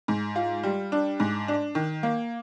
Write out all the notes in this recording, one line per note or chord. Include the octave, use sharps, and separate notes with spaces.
G#2
F4
G3
D4
G#2
D4
D#3
A#3